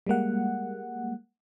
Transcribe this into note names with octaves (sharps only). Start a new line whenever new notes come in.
G3 G#3 A#3 F#5